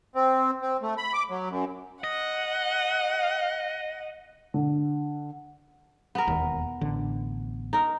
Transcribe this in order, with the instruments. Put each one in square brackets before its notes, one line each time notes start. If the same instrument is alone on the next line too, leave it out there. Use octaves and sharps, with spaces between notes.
[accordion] C4
C4
A3
B5
D6
F#3
F#2
[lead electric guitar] D#5 [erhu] F#5
[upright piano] D3
[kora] B3 A#4
[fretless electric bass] E1 D#2
A1 D3
[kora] D#4 A#4